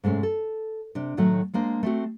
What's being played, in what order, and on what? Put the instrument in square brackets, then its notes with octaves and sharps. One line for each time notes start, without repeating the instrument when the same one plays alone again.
[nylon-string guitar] G#2 C3 G#3 A3 C#4
A4
C3 D4
A2 D#3 F#3 A3 F#4
G#3 A#3 D4 C5
A3 C4 F#4